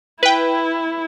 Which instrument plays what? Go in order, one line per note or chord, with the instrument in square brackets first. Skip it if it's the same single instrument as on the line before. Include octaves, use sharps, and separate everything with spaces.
[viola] E4 [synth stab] B4 G5